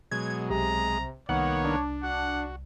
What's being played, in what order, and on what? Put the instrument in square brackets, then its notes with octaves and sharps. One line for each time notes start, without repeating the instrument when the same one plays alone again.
[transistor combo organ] B2 F#3 G#3 [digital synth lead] G#6
[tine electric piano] B1 [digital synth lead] C3 [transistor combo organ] G#3 [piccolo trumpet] A#5
[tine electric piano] C2 [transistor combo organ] D#3 A#3 B3 [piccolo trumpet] C#5 [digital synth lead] F#5
[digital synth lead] D4
[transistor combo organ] F#4 [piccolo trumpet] F#5